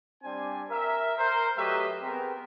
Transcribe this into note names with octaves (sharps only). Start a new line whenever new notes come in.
G3 C4 D4 G#5
A#4 E5
A#4 C5
F#3 A3 G4 B4 D#5 E5
B3 C4 G#4 A#4